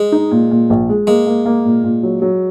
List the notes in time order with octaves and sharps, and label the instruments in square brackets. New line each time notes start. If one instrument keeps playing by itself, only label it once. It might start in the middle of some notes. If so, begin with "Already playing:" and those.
Already playing: [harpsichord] G#3
[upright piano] D#4
A#2
A#2
A#1
G#3
[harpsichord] G#3 [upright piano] A#3
[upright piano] A#3
A#3
A#2
A#2
F#3
F#3